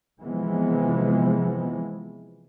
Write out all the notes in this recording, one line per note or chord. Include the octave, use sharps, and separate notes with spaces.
C3 E3 F3 G#3 B3